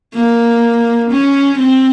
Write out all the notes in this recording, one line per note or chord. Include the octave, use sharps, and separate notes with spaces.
A#3
C#4
C4